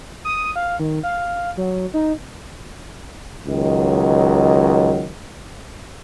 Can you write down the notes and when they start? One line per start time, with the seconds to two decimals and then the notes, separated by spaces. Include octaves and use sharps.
0.25 D#6
0.56 F5
0.80 D#3
1.04 F5
1.57 F#3
1.94 D#4
3.47 C#2 D#3 F#3